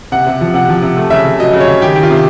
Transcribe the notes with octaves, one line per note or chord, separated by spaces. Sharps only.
C3 F#5
C3
F3
C3 F#5
F3
C3
A3
C#3 E5
C#3
F#3 D#5
C#3
C#5
C#3
D#3 G4
D#3
F4
C3